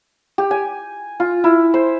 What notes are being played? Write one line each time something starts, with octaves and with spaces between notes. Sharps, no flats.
G4
G#5
F4
E4
C5